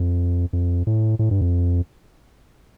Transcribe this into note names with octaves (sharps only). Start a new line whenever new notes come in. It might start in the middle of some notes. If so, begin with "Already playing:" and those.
Already playing: F2
F2
A2
A2
G2
F2